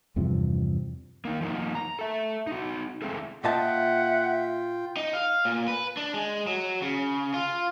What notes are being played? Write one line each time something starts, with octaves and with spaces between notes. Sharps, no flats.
E2 G2 C3 F3
A#3 D#4
F3 A#3 D#4
A#5
A4 E5
D#4 F#4
G#3 C4 E4 G#4 A4
A#2 F4 D#5 E5 F#5 G5 A5
D#4
F5
A#2
B4
D4
G#3
F#3
C#3
F4